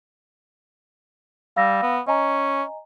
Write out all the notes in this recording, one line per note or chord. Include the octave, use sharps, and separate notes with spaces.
G3 F5 E6 A#6
B3
C#4 D#5 G#5 A#5